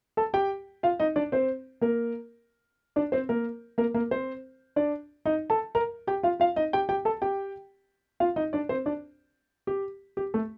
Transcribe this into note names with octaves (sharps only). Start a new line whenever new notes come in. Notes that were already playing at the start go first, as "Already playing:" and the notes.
A4 A5
G4 G5
F4 F5
D#4 D#5
D4 D5
C4 C5
A#3 A#4
D4 D5
C4 C5
A#3 A#4
A#3 A#4
A#3 A#4
C4 C5
D4 D5
D#4 D#5
A4 A5
A#4 A#5
G4 G5
F4 F5
F4 F5
D#4 D#5
G4 G5
G4 G5
A4 A5
G4 G5
F4 F5
D#4 D#5
D4 D5
C4 C5
D4 D5
G4
G4
A3 A4